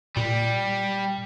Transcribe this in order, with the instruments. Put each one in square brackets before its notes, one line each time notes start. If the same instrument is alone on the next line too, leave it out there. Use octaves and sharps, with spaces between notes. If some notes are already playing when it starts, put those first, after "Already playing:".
[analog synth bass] A#2 [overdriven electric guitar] G3